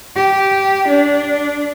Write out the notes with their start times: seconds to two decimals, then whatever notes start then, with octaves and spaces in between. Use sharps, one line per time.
0.16 G4
0.88 D4